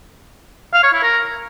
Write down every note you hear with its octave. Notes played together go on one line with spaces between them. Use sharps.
F5
C#5
E4
A#4